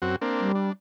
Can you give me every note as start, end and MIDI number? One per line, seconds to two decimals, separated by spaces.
0.02 0.16 42
0.02 0.16 60
0.02 0.16 66
0.21 0.52 58
0.21 0.52 60
0.21 0.52 62
0.40 0.70 55
0.55 0.72 62